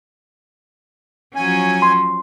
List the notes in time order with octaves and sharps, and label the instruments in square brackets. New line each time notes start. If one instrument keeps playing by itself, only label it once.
[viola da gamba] F3 F#3 C#4 [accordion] G#5
[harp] C6